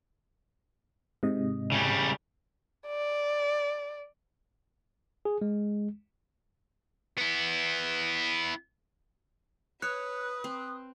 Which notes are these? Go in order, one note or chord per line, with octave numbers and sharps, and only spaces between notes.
G#2 C3 D#5
C#3 G3
D5
G#4
G#3
B3 E4
B4 C#5 D#6 F#6
C4